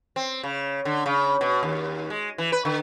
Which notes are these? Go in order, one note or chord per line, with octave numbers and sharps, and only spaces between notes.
C4
C#3
D3
C#3
B2
D#2
G#3
E3
B4
D3